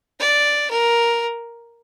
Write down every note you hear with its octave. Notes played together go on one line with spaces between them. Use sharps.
D5
A#4